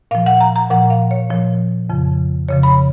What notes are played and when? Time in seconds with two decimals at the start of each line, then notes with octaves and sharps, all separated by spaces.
0.11 A#2 F3 F5
0.26 F#5
0.41 A#5
0.56 A#5
0.70 A#2 F3 F#5
0.90 F5
1.11 C#5
1.30 A#2 F3
1.90 F2 C#3 F3
2.49 F2 C#3 F3 C#5
2.63 B5